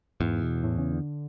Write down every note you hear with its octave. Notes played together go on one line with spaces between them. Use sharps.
E2 G#2
B2
A2
C#3
D3